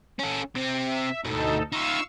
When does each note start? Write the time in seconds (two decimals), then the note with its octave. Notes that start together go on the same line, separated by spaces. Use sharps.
0.19 C#4 A4
0.55 C3 C4
0.87 E5
1.25 D2 G#2 B2 D#4 A4
1.72 D#4 F4 F5 C#6 E6